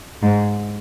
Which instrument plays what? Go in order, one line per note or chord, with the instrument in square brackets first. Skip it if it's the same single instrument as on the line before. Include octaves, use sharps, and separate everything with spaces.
[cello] G#2